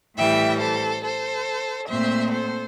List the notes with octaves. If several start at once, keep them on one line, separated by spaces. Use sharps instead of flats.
A2 E3 G3 E5 G5
A4 C5
A4 C5
A#2 A3 C4 C5 E5
A4 C5